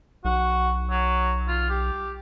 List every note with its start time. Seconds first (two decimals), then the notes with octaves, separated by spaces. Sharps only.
0.25 B1 F#4
0.90 F#3
1.48 F4
1.70 G4